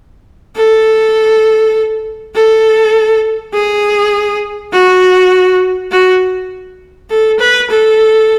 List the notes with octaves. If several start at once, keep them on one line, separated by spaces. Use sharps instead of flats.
A4
A4
G#4
F#4
F#4
A4
B4
A4